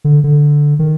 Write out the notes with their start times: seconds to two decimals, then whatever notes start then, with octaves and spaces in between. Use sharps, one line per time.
0.04 D3
0.24 D3
0.79 D#3